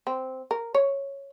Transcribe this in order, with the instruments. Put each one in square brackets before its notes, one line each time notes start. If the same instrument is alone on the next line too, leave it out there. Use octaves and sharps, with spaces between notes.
[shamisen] C4
A#4
C#5